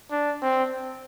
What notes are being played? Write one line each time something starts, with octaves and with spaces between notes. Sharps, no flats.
D4
C4